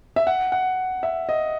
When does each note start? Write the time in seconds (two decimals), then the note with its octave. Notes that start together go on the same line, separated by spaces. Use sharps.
0.16 E5
0.27 F#5
0.52 F#5
1.03 E5
1.29 D#5